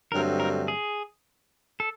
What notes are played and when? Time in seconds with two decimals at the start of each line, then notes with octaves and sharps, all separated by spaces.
0.12 G2 D3 F#3 A3 C4 A#4
0.40 A#4
0.68 G#4
1.80 A4